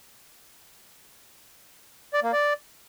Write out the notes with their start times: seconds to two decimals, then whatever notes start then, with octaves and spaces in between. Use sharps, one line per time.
2.14 D5
2.23 A#3
2.33 D5